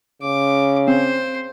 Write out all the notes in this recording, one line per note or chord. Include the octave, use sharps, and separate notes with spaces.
C#3 D6
C4 C5